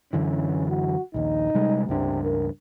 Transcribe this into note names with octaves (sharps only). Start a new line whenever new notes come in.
F#2 D3 E3 C#4
F#4
A#1 D#2 D#4
C3 G3 G#3
C#2 G2 C3 D4
A#4